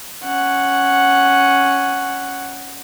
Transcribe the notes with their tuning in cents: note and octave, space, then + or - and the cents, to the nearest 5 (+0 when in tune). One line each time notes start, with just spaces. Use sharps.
C#4 +0 F#5 +0